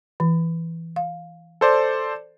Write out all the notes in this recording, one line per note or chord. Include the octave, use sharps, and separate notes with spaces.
E3
F5
A4 C5 D5